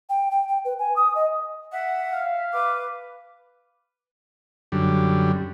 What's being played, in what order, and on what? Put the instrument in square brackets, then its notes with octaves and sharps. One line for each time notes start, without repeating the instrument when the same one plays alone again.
[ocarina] G5
G5
G5
B4
G#5
D#6
D#5
[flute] E5 [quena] F#5
[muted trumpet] F5
[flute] B4 [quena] D6
[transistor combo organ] F#2 D3 G3